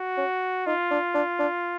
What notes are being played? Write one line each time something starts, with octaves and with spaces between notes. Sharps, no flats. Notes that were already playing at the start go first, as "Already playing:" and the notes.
Already playing: F#4
C#4
D#4 F4
D4
D4
D4